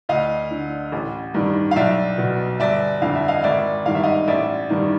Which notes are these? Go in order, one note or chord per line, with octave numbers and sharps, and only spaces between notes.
D2 D#5 F5
D3
A1
G2 D#3
F5
B1 D5 E5
B2
G1 D5 E5
F2 D3 F5
E5
D#5 F5
G#1 D5 E5
G2 D#3 F5
E5
D#5 F5
A1 D5 E5
G2 D#3